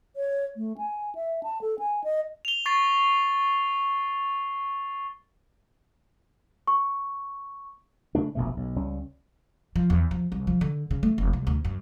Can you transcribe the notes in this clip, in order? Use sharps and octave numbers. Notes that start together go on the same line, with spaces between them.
C#5
A3
G#5
E5
A5
A4
G#5
D#5
F7 G7
C#6 A6 C7
C#6
C#3 A3 D4
F1 A#1 B2 A3
B1
C#2 G3 C#4
F3
E2
F3
C2
F3
D3
C#3
A3
F1
C2
D2
F#2